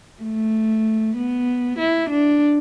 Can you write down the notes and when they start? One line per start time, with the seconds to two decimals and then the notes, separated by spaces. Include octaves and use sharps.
0.23 A3
1.16 B3
1.79 E4
2.10 D4